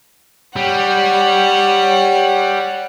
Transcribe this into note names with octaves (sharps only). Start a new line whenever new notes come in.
G3 C#5 F#5